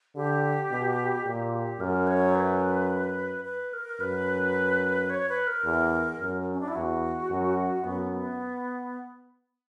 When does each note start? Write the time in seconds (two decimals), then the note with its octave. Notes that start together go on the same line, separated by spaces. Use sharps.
0.16 D3 G4
0.71 B2
1.25 A#2 G4
1.52 G4
1.80 F#2 A#4
2.07 C#5
2.35 B4
3.45 B4
3.73 A#4
4.00 F#2 B4
5.10 C#5
5.29 B4
5.47 A#4
5.65 E2
6.20 F#2
6.53 C#4
6.60 D4
6.68 E4
6.75 E2 F#4
7.30 F#2
7.84 F#2 B3
8.12 B3